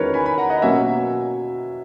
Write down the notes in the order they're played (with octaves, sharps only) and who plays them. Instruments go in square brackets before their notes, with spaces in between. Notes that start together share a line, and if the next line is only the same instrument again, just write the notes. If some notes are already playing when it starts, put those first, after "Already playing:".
Already playing: [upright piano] E2 D#3 G#3 C#4 F#4 [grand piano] A#4 B4 C#5
[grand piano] G#5 B5
G#5 B5
F#5 A#5
D#5 F#5
[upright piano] B2 F#3 A#3 C#4 [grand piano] E5 G#5